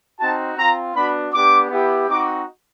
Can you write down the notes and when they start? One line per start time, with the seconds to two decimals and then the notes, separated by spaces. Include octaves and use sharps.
0.20 C4 D#4 F#4 A5
0.57 C4 F4 A#5
0.95 B3 D4 F#4 B5
1.32 B3 D4 G4 D6
1.70 B3 E4 G4
2.08 C4 D#4 F#4 D6